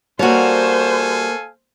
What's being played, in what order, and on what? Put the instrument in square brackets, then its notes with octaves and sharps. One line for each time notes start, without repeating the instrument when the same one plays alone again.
[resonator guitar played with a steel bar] G3 F#4 [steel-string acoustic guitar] A#3 C#5 [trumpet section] A4 F5 G#5 [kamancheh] C5